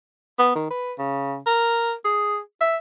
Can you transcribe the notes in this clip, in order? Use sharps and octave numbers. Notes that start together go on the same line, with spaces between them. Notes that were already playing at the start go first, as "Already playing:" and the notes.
B3
D#3
B4
C#3
A#4
G#4
E5